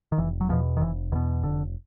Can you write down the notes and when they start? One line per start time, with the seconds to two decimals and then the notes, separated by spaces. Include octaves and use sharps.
0.12 D#3
0.18 F1 E3
0.41 F#3
0.49 E2 B2 F3
0.77 D#3
0.81 F1 E3
1.12 E2 D#3
1.15 B2
1.43 F1 D3